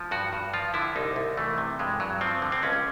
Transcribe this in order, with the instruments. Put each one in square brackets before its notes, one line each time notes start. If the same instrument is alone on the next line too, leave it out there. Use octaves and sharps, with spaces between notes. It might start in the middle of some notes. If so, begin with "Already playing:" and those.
Already playing: [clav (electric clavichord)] F3
G2 F#4
G2
F3 F4
D3 E4
C2 D#4
C2
E3 A3
C3
G2 G#3
G2 F#3
F3 C4
D3
C4
C#2 C#4